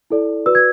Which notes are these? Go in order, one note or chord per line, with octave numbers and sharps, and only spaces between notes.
E4 A4 D5
F#4 B4 D5 E6
G#6